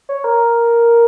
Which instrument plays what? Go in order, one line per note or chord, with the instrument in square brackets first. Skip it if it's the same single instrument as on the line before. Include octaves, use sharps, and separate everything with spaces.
[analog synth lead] C#5
A#4